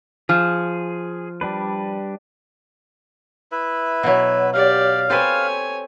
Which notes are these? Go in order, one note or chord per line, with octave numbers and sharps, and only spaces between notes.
F3 G#4
G3 D4 B4
E4 B4 E5
B2 F#3
G4 D5 F5
C4 A4 B4 C#5 G#5